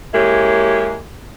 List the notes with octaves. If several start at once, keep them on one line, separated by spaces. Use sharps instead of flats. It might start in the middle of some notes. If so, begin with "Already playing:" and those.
G#3 A#3 C#4 E4 G4